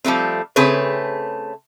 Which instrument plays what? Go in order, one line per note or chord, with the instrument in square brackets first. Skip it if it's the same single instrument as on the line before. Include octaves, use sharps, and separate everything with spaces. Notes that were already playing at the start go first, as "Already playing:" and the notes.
[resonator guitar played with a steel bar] F3 G3 A3 C4
C#3 A3 C4 G#4 B4 C#5